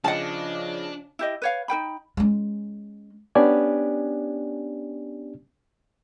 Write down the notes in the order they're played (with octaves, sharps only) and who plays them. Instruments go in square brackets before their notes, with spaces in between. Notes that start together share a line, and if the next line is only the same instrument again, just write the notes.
[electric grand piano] C#3 D#5 [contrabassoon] F3 [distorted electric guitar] D4 [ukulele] F#5 A5
[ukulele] E4 G4 D#5
B4 C#5 F5
D#4 A#4 G5 B5
[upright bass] G#3 C#4
[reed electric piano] B3 C#4 D4 G4 D5 G#5